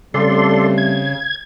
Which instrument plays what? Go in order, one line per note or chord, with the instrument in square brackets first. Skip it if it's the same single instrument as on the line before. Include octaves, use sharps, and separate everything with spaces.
[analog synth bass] C#3 [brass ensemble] G3 A3 C4 [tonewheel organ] A4 D5 C6
[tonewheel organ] G#6